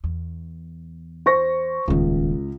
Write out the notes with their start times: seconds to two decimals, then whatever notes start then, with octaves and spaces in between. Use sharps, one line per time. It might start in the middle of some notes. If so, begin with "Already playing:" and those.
0.04 E2
1.26 C5 C#6 A#6
1.88 D#1 C#2 D#3